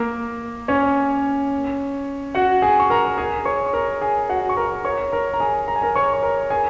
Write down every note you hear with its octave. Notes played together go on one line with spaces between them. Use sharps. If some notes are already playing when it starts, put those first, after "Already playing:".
Already playing: A#3 A#4
C#4 C#5
F#4 F#5
G#4 G#5
C#6
A#4 A#5
G#4 G#5
C#5 C#6
C#6
A#4 A#5
G#4 G#5
F#4 F#5
C#6
A#4 A#5
C#5 C#6
A#4 A#5
A#5
G#4 G#5
A#5
G#5
A#4 A#5
C#5 C#6
C#6
A#4 A#5
G#4 G#5